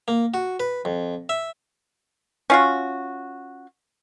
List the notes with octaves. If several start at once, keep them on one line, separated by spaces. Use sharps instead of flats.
A#3
F#4
B4
F2
E5
C#4 F4 F#4